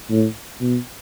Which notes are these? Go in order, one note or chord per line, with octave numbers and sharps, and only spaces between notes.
A2
B2